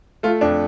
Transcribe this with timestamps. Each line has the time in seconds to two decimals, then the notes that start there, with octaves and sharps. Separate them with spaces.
0.23 A3 F4
0.41 F2 D4